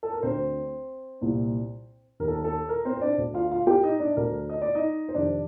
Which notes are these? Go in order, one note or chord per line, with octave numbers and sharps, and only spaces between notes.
A4
A#4
D2 D3 C4 C5
C2 A#2
D#2 D#3 A#4
A4
A#4
A4
A#4
C4 C5
C5
D4 D5
D2 D3
F4 F5
F4 F5
G4 G5
D#4 D#5
D4 D5
D2 D3 A#4
D#5
D5
D#4 D#5
C5
F2 C3 D#3 D4 D5